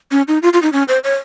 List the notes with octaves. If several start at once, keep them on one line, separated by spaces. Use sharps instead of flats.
C#4
D#4
F4
F4
D#4
C#4
C5
C#5